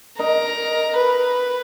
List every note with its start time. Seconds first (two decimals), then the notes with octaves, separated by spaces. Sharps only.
0.18 D#4 A#4
0.97 B4